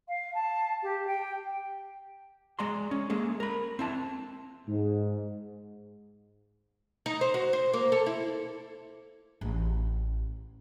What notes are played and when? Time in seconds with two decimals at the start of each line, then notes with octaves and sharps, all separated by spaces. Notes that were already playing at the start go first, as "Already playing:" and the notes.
0.08 F5
0.35 A5
0.83 G4
1.07 G5
2.59 G#3 D5 A#5 C6
2.91 C#4
3.10 G#3 A#3 G#4 A4
3.40 A#4 B5
3.79 C4 E4 A5
4.67 G#2
7.06 D#4
7.21 C5
7.34 F#4
7.53 C5
7.73 A#3
7.92 A4
8.06 E4
9.41 A1